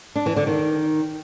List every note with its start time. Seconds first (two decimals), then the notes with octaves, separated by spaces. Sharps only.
0.16 D4
0.26 E3
0.36 D3
0.47 D#3